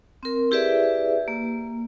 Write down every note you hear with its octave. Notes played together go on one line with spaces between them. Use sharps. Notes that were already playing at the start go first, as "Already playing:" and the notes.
C4 A#4
E4 G4 G#4 B4 D5 E5
A#3